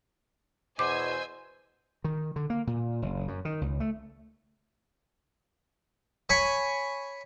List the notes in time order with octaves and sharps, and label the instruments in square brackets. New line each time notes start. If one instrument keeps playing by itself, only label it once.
[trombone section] E2 B2 [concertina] C5 [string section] D#5 G#5 E6 [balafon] D6
[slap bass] D#3
D3
A#3
A#2
F#1
F#2
D#3
C#2
A3
[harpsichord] C#5 G#5 B5 C#6